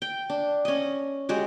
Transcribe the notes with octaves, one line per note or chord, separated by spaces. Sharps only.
G5
D4
C#4 D#5
G#3 F#4 G4